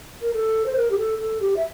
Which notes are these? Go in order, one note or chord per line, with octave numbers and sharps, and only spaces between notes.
A#4
A4
C5
A#4
G4
A4
A4
G4
E5